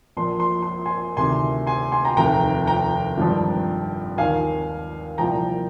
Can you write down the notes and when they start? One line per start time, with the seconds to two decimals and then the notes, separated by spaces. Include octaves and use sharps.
0.17 A#1 A#2 F3 C6
0.40 C6
0.62 C6
0.86 G#5 C6
1.17 D2 C3 D#3 G#5 C6
1.67 G#5 C6
1.92 G#5 C6
2.05 G5 A#5
2.17 F1 D#2 D#3 G5 A#5
2.67 G5 A#5
3.18 G#1 G2 F3
4.18 D#2 D#3 F5 G#5
5.18 C2 A#2 F3 G5 A#5